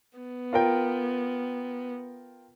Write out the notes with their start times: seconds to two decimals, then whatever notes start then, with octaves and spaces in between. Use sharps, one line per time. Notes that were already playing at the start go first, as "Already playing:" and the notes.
0.18 B3
0.53 F4 A#4 G5